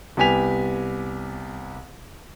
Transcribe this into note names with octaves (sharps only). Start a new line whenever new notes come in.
C2 B3 G4 G#5 B6 F7